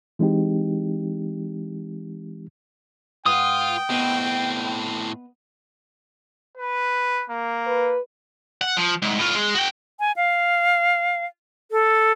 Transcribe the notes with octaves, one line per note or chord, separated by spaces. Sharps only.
E3 G#3 C4 D#4 G4
G#2 F4 B4 F#5 G5 D#6
A2 B3 C4 B4 D#5
B4
A#3
B4
F#5
F3
C2 G#2
A2 F4
G#3
F#4 G5
G#5
F5
A4